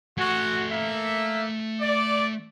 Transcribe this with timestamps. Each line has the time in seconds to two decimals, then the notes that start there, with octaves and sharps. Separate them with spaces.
0.17 A3 F#4 G#5
0.70 A#3 E5
1.80 D5